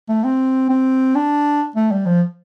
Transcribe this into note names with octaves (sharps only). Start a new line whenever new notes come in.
A3
C4
C4
D4
A3
G3
F3